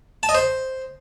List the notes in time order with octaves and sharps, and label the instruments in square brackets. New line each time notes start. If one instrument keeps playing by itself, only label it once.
[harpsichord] A5
D#5
C5